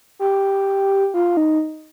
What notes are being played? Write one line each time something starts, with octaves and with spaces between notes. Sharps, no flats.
G4
F4
D#4